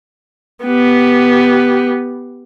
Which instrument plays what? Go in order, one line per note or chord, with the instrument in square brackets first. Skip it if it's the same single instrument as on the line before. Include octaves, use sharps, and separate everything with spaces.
[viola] B3 G4